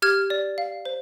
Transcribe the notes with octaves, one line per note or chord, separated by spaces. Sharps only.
G4 F6 G#6
D5
F5
C5